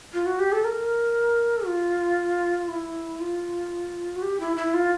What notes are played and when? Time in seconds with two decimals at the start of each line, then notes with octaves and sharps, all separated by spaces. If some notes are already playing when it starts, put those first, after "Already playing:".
0.13 F4
0.26 F#4
0.39 G4
0.52 A4
0.64 A#4
1.67 F4
2.69 E4
3.20 F4
4.16 F#4
4.22 G4
4.40 E4
4.56 E4
4.74 F4